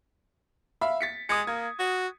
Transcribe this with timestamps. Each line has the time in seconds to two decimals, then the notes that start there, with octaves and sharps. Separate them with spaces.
0.81 E5 F5 B5
1.01 A6 B6 C#7
1.29 G#3 D#6 C#7
1.47 A#3 G#6
1.79 F#4